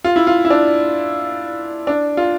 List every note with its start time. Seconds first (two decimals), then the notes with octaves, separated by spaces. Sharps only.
0.04 F4
0.16 E4
0.27 F4
0.45 E4
0.50 D4
1.87 D4
2.17 F4